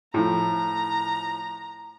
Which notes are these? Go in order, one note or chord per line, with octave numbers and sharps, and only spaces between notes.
A2 F3 A#5